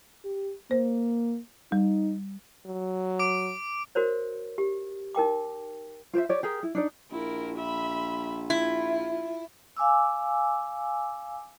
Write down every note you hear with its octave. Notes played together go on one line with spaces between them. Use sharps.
G4
A#3 C5
G3 D#4
F#3
D6 D7
F#4 A#4 C5 C#5
G4
D#4 A#4 G5 D6
F4 C5 D5 E5
G4 C#5 D5
G4 G#4 A#4
E4
D4 D#4 D5
A#1 E4 A#4
E5 B5
E4 F4
F5 G#5 D6 E6